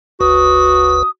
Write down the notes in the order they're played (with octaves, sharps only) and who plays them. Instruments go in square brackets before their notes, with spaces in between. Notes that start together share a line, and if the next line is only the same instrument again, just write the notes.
[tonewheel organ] F#1 D2 B4 [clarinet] F#4 [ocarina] D#6